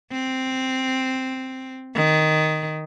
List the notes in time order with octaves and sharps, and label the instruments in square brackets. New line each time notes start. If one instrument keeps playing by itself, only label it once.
[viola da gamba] C4
D#3